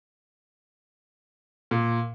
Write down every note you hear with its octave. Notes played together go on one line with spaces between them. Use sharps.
A#2